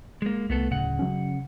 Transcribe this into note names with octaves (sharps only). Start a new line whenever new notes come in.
G#3 A#3
C2 A3 B3 A4
D1 C#3 F#5
F#3 C#4